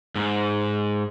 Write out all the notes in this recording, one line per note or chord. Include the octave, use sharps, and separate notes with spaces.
G#2